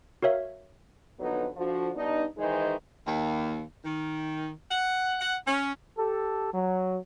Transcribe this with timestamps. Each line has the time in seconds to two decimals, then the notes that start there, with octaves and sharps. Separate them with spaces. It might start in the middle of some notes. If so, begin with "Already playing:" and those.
0.22 F#4 A#4 C#5 E5 F5
1.19 F2 D3 F#3 B3 D#4 B4
1.57 D3 F3 F#4
1.95 G2 B3 D4 D#4
2.38 D#3 E3 G#3 D#4 C5 D#5
3.07 D#2
3.85 D#3
4.71 F#5
5.20 F#5
5.47 C#4
5.97 G4 A4
6.53 F#3